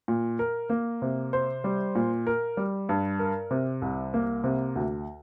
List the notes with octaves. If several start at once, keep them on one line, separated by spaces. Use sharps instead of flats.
A#2
A#4
A#3
C3
C5
G3
A#2
A#4
G3
G2
A#4
C3
C2
A#3
C3
D2